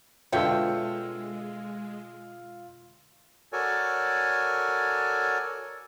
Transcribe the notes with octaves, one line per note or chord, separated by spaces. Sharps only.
B2 D3 G#3 F4 C#5 E5 G5 E6
F#4 A4 A#4 C#5 D5 G#5